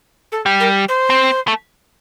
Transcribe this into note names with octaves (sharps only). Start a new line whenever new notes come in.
A4
G3
A#4
C5
C4
A3